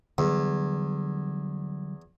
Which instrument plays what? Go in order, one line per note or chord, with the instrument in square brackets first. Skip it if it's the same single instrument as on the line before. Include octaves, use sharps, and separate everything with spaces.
[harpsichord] E2 [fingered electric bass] D3 F#3 G3